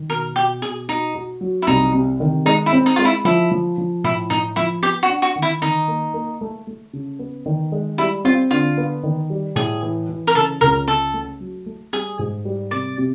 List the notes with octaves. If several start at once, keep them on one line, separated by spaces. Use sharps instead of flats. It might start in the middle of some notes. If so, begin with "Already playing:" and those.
Already playing: D#3
B2 A#4
B2 G4
B2 G#4
D#4 F#4
F#4
F#3
E4
C2 D#4
C3
D#3
G#3 D#4
E4
C4
D#4
G#3 F4
E4
F3 E4
F3
F3
A2 E4
A2 D#4
F3 E4
B3 G4
F#4
D4
F#4
D#3
E4
D#3 D#4
A#3
A#3
A3
A3
C#3
B3
D#3
G#3
G3 E4
C4 F4
D3 F4
B3
D#3
G3
A2 G#4
E3
E3
A#4
C#3 A4
C#2 A#4
C#3 A4
A3
F#3
A3
G3 G#4
G#2
G3
C3 D5
C3